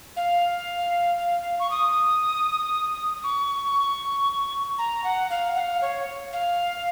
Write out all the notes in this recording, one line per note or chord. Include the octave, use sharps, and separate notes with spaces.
F5
C#6
D#6
C#6
A#5
F#5
F5
F#5
F5
C#5
F5